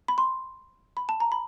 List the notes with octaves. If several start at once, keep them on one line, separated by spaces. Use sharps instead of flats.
B5
C6
B5
A5
A#5
B5